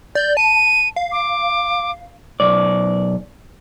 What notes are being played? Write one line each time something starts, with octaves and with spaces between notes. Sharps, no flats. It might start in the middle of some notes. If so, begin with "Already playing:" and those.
D5 G6
A5 D#7
F5
D6
B1 D5